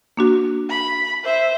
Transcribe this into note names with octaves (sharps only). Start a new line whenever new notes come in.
A#3 D4 F#4
B5
C5 E5